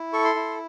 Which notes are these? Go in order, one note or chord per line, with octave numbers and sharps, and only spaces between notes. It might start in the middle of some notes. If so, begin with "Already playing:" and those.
Already playing: E4
A4 C#6
C6
E4